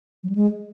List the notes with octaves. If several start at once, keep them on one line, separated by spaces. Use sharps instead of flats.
F#3
G3
G#3